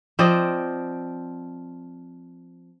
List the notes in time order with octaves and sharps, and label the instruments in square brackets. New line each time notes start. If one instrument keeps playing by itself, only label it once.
[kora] F3 C4 D5 D#5